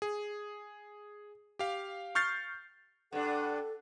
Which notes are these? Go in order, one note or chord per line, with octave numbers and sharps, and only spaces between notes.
G#4
G4 F5
C#6 F6 G6 A6 C7
G2 D4 A4 F#5